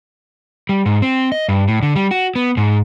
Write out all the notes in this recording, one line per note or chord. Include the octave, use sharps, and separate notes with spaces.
G3
G#2
C4
D#5
G2
A2
D3
G3
F#4
B3
G#2